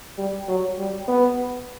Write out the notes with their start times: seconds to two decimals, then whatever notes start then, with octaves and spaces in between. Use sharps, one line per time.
0.18 G3
0.48 F#3
0.78 G3
1.08 B3